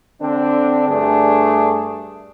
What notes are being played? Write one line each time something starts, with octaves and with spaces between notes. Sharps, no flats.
D3 C4 D4
G2 A3 D4 G#4